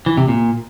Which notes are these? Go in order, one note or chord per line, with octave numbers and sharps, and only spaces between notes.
E3
C3
A#2